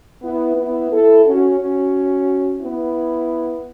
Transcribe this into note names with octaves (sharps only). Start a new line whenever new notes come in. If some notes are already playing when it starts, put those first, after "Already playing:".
B3 E4
B3 E4
E4 A4
C#4 F#4
C#4 F#4
B3 E4